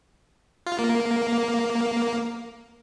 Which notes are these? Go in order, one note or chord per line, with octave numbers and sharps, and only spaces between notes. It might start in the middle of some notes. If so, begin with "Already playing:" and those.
F4
A#3